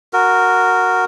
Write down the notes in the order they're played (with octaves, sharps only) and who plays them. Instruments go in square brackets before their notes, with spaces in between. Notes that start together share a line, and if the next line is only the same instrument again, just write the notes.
[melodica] F#4 A#4